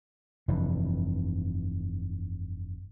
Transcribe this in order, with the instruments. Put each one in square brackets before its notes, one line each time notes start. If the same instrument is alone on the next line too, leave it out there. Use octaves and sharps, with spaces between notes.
[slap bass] F1 G2 E3